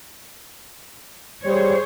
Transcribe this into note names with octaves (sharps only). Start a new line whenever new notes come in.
G3 G#4 C5 C#5